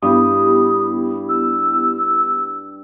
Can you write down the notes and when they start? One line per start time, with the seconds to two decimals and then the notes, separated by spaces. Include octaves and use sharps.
0.03 G2 B3 E4 G4 D#6
1.29 E6